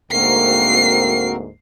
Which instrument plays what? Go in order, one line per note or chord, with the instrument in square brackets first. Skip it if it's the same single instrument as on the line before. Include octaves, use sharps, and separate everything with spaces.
[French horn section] D2 G#2 A#3 [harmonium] C4 F#4 A#4 [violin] C7